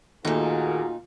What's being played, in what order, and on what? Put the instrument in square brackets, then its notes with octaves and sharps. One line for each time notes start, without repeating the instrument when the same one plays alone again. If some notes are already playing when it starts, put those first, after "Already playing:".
[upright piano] D#2 A3 [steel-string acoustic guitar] A#2 D#4 [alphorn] F4 [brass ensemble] F#4 G#4 A#4